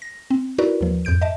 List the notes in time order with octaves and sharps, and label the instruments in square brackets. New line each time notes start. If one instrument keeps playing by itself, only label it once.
[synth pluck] A#6
C4
D#4 E4 F#4 A#4 B4 D5
D#2 F3
F2 G#2 G6 D7
D#5 E5 A5